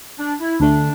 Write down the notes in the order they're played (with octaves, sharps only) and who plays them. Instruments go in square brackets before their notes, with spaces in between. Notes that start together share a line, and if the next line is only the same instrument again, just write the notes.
[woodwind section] D4
E4
[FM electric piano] D2 D3 A3 [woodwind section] D4